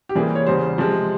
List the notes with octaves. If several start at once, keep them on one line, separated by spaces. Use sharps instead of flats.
G4
C3 E3 G3 A#3 G#4
C#5
E2 C#3 G3 C5
C3 F3 G#3